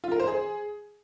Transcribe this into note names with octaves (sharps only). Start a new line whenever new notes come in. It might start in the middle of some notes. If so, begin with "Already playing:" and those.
F4
A#4
C5
G#4